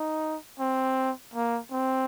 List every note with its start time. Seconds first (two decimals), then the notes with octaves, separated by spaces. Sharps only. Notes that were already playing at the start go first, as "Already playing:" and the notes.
Already playing: D#4
0.60 C4
1.34 A#3
1.72 C4